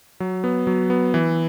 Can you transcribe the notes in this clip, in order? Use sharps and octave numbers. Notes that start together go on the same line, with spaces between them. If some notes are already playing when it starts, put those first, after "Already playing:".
F#3
B3
F#3
B3
E3